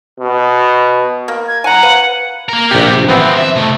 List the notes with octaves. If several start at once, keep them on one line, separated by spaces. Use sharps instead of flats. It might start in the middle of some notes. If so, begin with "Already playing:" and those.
B2
A#3
G#6
F#5 G#5 A#5
B4 F5
A#3 A#4
A#1 C3 B3 G4
E3 F3 B3 C4
E5
C3 A3